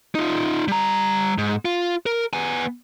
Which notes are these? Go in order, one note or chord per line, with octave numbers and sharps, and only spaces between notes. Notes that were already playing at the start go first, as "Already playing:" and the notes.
D#4 F4
G3 A#5
G#2
F4
A#4
B3 G#5